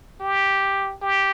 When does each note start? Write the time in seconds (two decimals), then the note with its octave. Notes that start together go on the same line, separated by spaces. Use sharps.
0.21 G4
1.02 G4